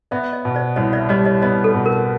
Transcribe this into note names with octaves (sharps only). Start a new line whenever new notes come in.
B3 D5 E5
C#5 D#5
B2
C5 D5
C2 C#5 D#5
D5 E5
G3 C#5 D#5
C#5 D#5
B3 C#5 D#5
A4
B2
A#4